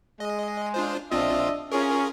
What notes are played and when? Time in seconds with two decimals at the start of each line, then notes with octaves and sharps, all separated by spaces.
0.20 G#3 D#5
0.74 D4 F4 C5
1.12 A#1 C4 D4 F4 D#5 E5
1.72 C#4 F4 G#4 A#4